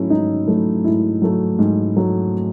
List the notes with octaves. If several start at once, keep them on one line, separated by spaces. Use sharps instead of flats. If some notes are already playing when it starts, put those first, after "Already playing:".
Already playing: G#2 F#3 A3 C#4 E4
G#2 D#4
F#3 A3
G#2 E4
F#3 A3
G#2
F#3 A3